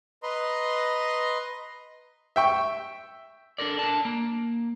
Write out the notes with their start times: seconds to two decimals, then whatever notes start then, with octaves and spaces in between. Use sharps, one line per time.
0.23 B4 D#5 A#5 C6
2.36 E5 G5 C#6
3.58 D4 A4 A#4 D5
3.79 D4 A#4 A5
4.05 A#3